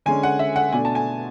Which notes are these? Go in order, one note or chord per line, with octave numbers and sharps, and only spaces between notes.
D3 G#3 C#4 G#5
F#5
E5
F#5
B2 A3 D4 G#5
A5
G#5